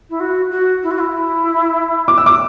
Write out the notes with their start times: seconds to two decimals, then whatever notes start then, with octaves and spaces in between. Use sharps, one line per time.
0.09 E4
0.20 F#4
0.51 F#4
0.83 E4
0.91 F#4
0.99 E4
2.08 D6
2.18 E6
2.26 D6